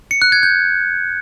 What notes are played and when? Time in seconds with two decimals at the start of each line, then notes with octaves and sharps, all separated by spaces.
0.11 C#7
0.22 F#6
0.32 G#6
0.43 G6